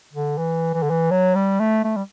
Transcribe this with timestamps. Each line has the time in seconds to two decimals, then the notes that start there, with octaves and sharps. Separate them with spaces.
0.13 D3
0.38 E3
0.74 E3
0.83 D3
0.90 E3
1.11 F#3
1.35 G3
1.60 A3
1.84 A3
1.96 G3